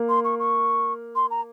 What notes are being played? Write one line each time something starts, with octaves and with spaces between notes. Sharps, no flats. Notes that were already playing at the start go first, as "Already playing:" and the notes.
Already playing: A#3
C6
C#6
C#6
C6
A#5